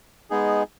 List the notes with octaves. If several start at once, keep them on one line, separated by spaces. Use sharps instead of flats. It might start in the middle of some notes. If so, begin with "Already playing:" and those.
G#3 B3 D#4 G#4